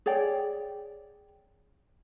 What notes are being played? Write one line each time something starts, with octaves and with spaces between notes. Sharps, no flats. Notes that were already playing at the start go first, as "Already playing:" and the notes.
G#4 C#5 D5 G5